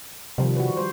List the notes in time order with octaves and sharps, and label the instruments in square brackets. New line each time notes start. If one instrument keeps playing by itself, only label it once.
[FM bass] C3 [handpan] D#3 F3 G3
[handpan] F#4 B4
G3 C5